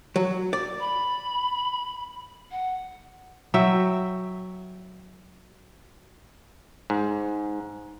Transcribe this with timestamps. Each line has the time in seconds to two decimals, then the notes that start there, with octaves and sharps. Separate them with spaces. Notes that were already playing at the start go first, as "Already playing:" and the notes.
0.16 F#3
0.53 D5
0.80 B5
2.51 F#5
3.54 F#3 E5 G5
6.90 G#2